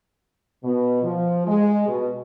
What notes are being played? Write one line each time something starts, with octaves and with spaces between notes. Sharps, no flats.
B2
F3
G#3
B2